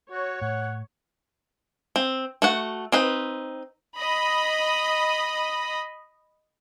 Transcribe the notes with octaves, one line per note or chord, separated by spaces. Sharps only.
F#4 C#5
A2 F#5
C4
A3 F#4 F#5
C4 D#4 B4
D#5 B5